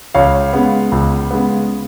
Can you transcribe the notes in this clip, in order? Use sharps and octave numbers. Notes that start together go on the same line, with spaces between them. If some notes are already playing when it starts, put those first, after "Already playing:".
C#2 C#5 F5
C#3 G#3 B3
C#2
C#3 G#3 B3